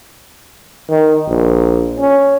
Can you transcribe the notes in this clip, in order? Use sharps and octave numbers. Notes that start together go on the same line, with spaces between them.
D#3
A#1
C#4